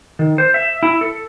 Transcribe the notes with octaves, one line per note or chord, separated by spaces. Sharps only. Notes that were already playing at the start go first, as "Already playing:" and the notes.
D#3
C5
E5
E4
A4